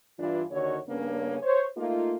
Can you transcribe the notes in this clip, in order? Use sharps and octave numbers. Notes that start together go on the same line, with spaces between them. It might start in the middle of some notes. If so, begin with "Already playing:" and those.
G2 E3 D4 F4
D#2 D3 D#3 F#4 C#5
G2 C#3 A#3 B3 C#4 D4
C5 C#5
A3 A#3 D#4 F4